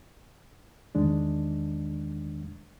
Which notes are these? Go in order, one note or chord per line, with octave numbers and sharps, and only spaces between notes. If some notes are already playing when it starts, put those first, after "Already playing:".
E2 D#3 G#3 D4